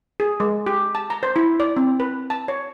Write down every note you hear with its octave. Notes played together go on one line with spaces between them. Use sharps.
G#4
G#3
G4
A5
A#5
C5
E4
D5
C4
B4
A5
C#5